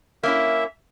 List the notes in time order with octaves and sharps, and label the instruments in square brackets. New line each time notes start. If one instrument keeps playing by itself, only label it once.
[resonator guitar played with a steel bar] A#3 C#4 E4 [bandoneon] E5